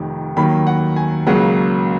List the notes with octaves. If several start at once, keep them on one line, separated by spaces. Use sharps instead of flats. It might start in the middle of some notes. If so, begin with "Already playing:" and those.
Already playing: F1 F2 D#3
D#2 D#3 F#3 A#3 B5
F#5
G#5
C#2 C#3 F#3 A#3 F#5